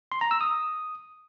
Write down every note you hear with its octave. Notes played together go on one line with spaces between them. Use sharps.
C6
A#5
E6
D#6